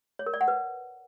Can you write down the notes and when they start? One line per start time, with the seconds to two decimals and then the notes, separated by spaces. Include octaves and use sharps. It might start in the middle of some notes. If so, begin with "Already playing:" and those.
0.19 C#5
0.26 A#4
0.34 D5
0.41 F#5
0.48 B4